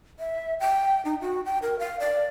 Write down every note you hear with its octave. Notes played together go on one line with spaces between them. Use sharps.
E5
G5
D#4
F#4
G5
A#4
F5
D5